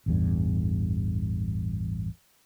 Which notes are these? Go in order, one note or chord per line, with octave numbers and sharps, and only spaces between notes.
A1 E2 G2